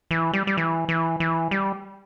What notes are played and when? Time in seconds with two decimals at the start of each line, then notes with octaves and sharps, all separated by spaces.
0.11 E3
0.33 G3
0.47 G3
0.57 E3
0.89 E3
1.20 E3
1.51 G3